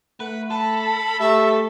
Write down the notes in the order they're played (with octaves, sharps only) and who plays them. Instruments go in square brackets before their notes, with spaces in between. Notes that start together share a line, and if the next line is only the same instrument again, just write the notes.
[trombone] A3 [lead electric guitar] B4 [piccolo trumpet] F#5
[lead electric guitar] A4 [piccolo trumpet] B5
[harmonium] A3 [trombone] G4 [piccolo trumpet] E5